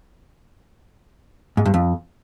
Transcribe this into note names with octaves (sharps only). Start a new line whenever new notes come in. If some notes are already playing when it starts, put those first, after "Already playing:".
G#2
G2
F2